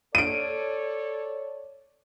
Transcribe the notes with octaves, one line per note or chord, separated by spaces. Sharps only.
A4 C#5 D5 D7 D#7